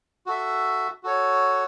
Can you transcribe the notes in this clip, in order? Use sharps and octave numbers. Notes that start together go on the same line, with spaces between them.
F#4 A4 E5
F#4 A4 C#5